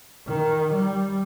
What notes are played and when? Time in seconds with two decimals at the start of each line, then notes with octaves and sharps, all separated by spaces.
0.26 D#3
0.73 G3